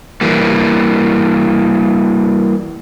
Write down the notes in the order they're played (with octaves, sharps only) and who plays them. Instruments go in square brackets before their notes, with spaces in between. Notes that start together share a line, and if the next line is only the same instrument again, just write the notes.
[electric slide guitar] E3 G3 A#3